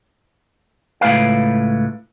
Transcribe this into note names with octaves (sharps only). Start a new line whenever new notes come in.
C#2 A2 B4 F5